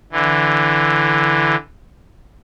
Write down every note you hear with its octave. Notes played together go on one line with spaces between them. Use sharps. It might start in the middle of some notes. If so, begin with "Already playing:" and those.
D3 E3